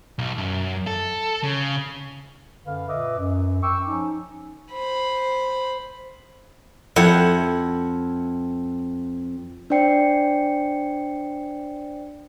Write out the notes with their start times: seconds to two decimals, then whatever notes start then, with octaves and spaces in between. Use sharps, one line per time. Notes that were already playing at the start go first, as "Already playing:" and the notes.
0.19 B1
0.38 F#2
0.87 A4
1.43 C#3
2.66 F#2 D3 B4 F5
2.88 A#2 B4 D#5 E5 D6
3.18 F#2
3.62 G5 C#6 D6 E6
3.86 F3 C#4 D#4
4.73 C5 B5
6.96 F2 E4 F#5
9.70 D4 C5 D5 G5 C7 C#7